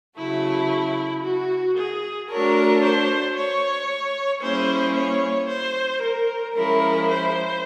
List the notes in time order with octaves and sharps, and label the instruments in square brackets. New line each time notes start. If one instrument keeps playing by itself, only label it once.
[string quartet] C#3 F#3 A3 [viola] E4
[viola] F#4
G#4
[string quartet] A3 D4 F#4 A4 C#5 [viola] A#4
[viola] C5
C#5
[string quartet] G3 A#3 C#4 E4 G#4 [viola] C5
[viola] C#5
C5
A#4
[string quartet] F3 G#3 C#4 E4 [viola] A#4
[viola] C5